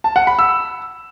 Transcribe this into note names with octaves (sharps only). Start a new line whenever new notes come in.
A5
F#5
B5
E6